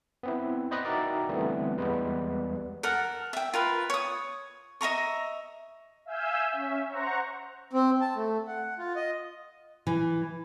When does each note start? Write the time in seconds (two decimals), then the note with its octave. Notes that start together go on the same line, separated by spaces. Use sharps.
0.23 B3 C4 E4
0.71 C5 D5 D#5 B5 D#6 F#6
0.84 D#4 F#4 A#4 D5 E5 G5
1.29 D3 E3 G3 A3 B3 C4
1.78 E2 G3 G#3 B3 B4
2.83 A4 A#4 F#5
3.33 E5 G5
3.54 F4 A#4 B4
3.90 C#5 D#6
4.81 D#5 E5 A#5 C#6
6.05 E5 F5 G#5 E6 G6
6.50 C#4 E5
6.89 C5 F#5 A#5 C#6
7.73 C4
8.01 A5
8.16 A3
8.48 F#5
8.79 F4
8.96 D#5
9.87 E3